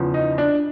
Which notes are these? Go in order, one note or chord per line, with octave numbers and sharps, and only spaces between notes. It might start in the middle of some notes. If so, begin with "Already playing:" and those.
Already playing: E2 C#3 F3
D#4
D4